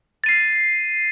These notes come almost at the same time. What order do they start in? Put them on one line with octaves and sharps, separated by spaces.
A6 D#7 C7